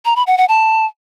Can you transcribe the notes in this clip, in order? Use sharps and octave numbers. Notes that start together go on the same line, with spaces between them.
A#5
B5
F#5
F#5
A5